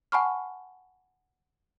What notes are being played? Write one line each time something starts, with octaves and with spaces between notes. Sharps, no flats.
F#5 G#5 A5 B5 C#6 F6